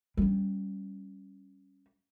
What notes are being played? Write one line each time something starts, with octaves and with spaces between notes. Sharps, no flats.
G3 C#4